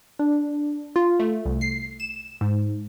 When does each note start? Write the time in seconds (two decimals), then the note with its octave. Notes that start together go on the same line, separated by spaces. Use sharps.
0.19 D4
0.96 F4
1.20 A3
1.45 C2
1.61 C7
2.00 E7
2.41 G#2